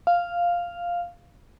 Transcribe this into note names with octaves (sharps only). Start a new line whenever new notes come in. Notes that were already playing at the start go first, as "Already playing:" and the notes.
F5